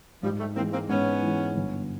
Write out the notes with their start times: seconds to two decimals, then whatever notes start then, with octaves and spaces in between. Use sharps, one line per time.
0.23 G#2 F3 G3
0.39 G3 A3
0.56 E3 A#3 C4
0.60 G#3
0.72 A#3 C4
0.89 G#2 B3 C#4
1.23 E3 G#3
1.55 G1